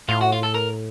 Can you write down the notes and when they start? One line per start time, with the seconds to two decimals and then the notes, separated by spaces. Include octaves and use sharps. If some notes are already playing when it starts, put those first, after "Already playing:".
0.09 A2 F4
0.21 F#4
0.32 F4
0.43 A4
0.54 A#4